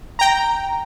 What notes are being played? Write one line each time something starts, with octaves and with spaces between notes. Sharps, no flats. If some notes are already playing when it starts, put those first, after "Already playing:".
G5 A#5